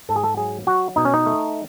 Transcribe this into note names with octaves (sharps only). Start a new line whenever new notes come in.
G#2 A4
G#4
A4
F#3 G#4
F#3 F#4
B2 D#4
C#4
D#4
A3